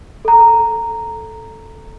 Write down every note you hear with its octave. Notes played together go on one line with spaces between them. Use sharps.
A4 A#5